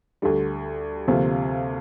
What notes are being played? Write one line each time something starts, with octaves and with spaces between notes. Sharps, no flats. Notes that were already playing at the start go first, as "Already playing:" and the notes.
D2 D3 G3
D2 C3 F3 A#3